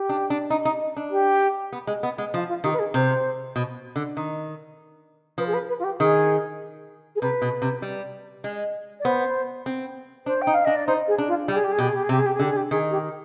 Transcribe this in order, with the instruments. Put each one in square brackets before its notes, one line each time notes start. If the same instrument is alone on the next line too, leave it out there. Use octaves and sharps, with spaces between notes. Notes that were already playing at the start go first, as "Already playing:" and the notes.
Already playing: [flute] G4
[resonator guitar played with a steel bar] D4
D4
D#4
D#4
D4
[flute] G4
[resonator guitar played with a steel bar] B3
G#3
B3
G#3
[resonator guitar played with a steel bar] F3 [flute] F4
[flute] F4
[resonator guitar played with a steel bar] D#3 [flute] G4
[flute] B4
G#4
[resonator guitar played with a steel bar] C3 [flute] C5
[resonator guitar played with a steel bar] B2
D3
D#3
[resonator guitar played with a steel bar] F3 [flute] B4
[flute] G#4
B4
B4
F4
G4
[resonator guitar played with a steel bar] D#3 [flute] G#4
[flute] G#4
[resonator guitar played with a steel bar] C3 [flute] B4
[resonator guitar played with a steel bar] B2
C3
G3
G#3
[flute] D5
[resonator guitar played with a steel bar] B3 [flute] C5
[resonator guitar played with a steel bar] C4
[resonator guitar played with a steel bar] D4 [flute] C5
[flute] G5
[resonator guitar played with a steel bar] D#4
[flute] F5
[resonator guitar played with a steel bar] D4 [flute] D#5
[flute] D5
[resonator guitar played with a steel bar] D#4 [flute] C5
[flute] G#4
[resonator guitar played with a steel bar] D4
[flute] F4
[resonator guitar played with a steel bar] G3 [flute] G4
[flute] G#4
G4
G#4
[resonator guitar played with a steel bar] B2 [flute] G4
[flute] G#4
G4
G#4
[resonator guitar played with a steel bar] C3 [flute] G4
[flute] G#4
G4
G#4
[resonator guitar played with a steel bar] D3 [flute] G4
[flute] G#4
G4
[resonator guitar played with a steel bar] D#3 [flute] G#4
[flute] G4